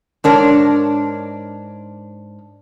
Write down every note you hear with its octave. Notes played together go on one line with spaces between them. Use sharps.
G#2 D4 A#4 C#5